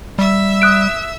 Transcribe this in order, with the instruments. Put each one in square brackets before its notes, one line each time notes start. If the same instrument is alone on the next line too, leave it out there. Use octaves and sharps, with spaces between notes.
[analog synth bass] G3 [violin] E5 E6
[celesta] D#6 F#6 D7